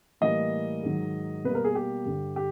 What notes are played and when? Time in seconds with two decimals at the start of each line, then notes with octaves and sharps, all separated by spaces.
0.21 A2 E3 G3 A#3 D#5
0.83 G#2 D#3 F#3
1.44 B2 G3 A#3 B4
1.55 A#4
1.64 G#4
1.75 G4
2.05 G2 D3 G3
2.36 G4